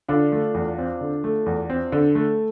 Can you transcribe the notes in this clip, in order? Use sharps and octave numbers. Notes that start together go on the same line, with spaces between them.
D3 D4 F4
A3
E2
C4
D3
A3
E2
C4
D3
A3